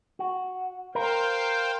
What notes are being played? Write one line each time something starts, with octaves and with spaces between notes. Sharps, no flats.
F#4
A#4 C5 F5 G5